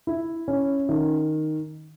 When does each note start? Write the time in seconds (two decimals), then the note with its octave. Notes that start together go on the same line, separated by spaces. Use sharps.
0.07 E4
0.48 C#4
0.89 D#3